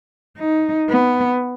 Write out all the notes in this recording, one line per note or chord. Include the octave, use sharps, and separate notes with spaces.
D#4
B3